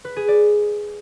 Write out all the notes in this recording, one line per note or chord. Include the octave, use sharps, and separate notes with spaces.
B4
G#4
D5